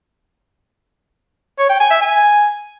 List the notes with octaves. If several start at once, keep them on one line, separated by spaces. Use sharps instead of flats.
C#5
G5
G#5
E5
G#5